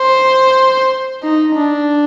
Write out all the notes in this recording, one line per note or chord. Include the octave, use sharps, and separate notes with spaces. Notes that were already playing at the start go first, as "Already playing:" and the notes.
Already playing: C5
D#4
D4